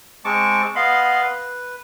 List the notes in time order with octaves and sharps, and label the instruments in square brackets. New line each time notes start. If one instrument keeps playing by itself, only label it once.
[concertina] G#3 C4 A5 C#6 D6
B3 D#5 F5 B5 C6
B4